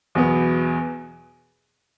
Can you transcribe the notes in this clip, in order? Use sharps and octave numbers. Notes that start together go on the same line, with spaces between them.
E2 B2 F#3 B3